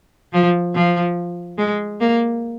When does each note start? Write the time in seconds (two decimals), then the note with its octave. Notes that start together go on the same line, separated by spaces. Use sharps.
0.33 F3
0.74 F3
1.58 G#3
2.00 A#3